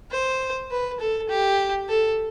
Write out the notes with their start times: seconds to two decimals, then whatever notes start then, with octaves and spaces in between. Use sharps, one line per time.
0.11 C5
0.71 B4
1.00 A4
1.29 G4
1.89 A4